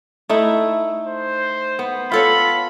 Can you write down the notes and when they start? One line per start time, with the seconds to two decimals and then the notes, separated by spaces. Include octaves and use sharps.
0.29 A3 D#4 E4
1.08 C5
1.79 B3
2.12 F4 A4 C#5 B5